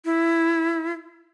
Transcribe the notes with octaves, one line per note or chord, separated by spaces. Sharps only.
E4